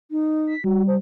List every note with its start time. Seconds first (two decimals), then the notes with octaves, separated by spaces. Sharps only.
0.11 D#4
0.47 B6
0.64 G3 F#4
0.87 C5